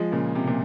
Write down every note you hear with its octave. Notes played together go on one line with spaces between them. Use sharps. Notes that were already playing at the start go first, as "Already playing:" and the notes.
Already playing: F3 G#3
A#2 C#3
C3
A#2